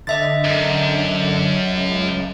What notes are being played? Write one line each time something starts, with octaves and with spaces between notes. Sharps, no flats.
D3 D#5 E5 A6
F#2
C#2